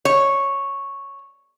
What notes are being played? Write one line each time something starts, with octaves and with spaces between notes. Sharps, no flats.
C#5